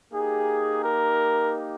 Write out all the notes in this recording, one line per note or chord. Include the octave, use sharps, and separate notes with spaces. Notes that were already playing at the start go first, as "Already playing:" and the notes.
A#3 D#4 G4 G#4
A#4